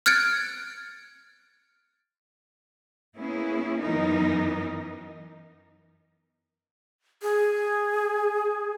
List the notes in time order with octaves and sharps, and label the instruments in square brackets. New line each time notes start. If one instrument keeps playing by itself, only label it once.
[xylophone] F6 F#6 G#6 A6 C#7 D7
[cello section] A#3 B3 C#4 E4 G#4
F#2 E3 B3 D#4 A#4
[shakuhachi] G#4